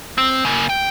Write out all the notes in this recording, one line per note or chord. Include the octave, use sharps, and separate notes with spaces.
C4
C#3 A#3
G5